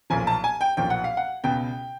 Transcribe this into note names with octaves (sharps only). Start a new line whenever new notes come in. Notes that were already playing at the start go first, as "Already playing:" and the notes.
B1 A#2 F3 G#5
A5
G#5
G5
B1 A#2 F3 G5
F#5
F5
F#5
C#2 B2 G5